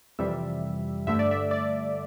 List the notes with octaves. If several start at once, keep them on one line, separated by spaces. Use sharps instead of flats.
F2 C3 E3 G3 E5
G2 D3 A3 E5
D5
E5
D5